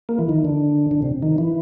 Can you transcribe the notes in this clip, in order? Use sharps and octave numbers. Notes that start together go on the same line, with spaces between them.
A#3
E3
D#3
D3
D3
C3
D#3
E3